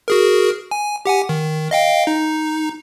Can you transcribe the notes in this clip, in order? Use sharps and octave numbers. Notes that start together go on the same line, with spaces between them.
F#4 G#4 A#4
G#5
G4 F#5 G#5
D#3
D#5 F5 G5
D#4